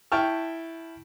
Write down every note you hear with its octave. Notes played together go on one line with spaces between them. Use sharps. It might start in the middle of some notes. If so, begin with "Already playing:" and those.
E4 G5 A5 C#6 F6